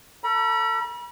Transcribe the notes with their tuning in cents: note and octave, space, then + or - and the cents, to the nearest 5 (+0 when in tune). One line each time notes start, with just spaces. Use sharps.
A4 +35 B5 -40